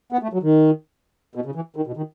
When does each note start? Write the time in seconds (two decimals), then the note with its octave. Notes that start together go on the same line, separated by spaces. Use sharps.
0.12 B3
0.23 A3
0.33 F#3
0.43 D#3
1.35 B2
1.46 C#3
1.55 E3
1.76 D#3
1.87 B2
1.97 D#3